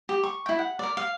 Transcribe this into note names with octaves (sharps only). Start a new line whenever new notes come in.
G4
C#6
E4 G5
F#5
A#4 D5
F5